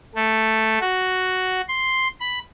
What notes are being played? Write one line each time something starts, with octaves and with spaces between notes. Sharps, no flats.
A3
F#4
C6
B5